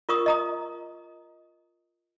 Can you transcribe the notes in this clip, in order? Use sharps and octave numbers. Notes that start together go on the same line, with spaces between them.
F4 A#4 C#6 D#6
D#5 A#5 D#6